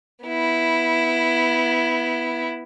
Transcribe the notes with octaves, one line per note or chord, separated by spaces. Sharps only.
B3 E4